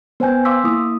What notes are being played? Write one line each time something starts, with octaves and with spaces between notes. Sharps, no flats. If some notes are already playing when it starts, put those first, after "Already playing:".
B3 C5 G5 G#5 G6
F5 C6 D6 E6 B6
A#3 E4 D#6